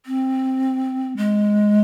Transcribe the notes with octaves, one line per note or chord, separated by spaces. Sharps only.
C4
G#3